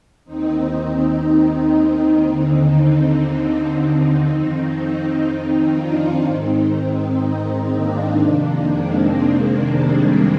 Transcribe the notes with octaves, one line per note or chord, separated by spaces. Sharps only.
D#2 D#3 C4 D#4
C4 D#4
D#2 D3 C4 D#4
C4 D#4
C4 D#4
F2 D#3
C4 D#4
D4 F4
G#2 D#3 C4 D#4
C4 D#4
A#3 D4
F2 C3 D#3
G#3 C4
G3 A#3